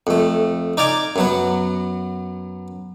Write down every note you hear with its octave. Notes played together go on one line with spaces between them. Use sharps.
F2 A3
D#4 D5 F5 G#5 D6
F#2 F#3 B3